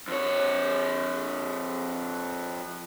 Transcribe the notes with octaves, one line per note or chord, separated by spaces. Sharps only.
F2 C#5